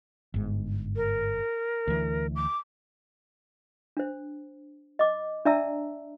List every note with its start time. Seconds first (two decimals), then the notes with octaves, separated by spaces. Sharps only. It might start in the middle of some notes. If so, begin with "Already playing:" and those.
0.34 G1 G#2
0.96 A#4
1.88 D2 E3
2.36 D6
3.97 D4 C5
4.99 D#5 D6
5.45 D4 D5 E5 A5 A#5 E6